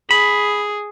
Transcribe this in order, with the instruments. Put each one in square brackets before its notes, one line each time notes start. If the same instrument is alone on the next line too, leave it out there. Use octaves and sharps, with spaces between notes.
[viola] G#4 [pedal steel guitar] B5